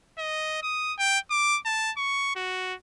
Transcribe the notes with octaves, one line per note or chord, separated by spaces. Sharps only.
D#5
D#6
G5
D6
A5
C#6
F#4